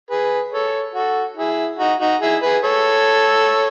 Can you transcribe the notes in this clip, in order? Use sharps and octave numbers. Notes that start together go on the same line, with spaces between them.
G#4 B4
A4 C#5
F#4 A4
E4 G#4
D#4 F#4
D#4 F#4
E4 G#4
G#4 B4
A4 C#5